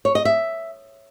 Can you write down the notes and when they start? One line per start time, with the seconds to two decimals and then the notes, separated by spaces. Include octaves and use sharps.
0.05 C#5
0.15 D#5
0.25 E5